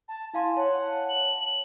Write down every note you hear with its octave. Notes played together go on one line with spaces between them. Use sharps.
A5
E4 F5 G#5 C6
C#5 F#5 A5
F#7